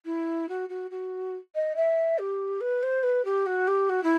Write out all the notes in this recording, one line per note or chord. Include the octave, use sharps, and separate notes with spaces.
E4
F#4
F#4
F#4
D#5
E5
G4
B4
C5
B4
G4
F#4
G4
F#4
E4